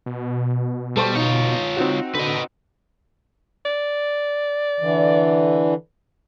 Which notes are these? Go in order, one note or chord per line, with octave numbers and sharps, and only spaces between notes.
B2
G3 A4 C5 C#6
D#4 F4 C#5
C4 D#4 F#4
D3 B4 D#5
D5
D3 E3